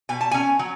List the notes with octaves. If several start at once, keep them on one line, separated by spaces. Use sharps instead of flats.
B2 G#5
A5
C#4 G#5
F#3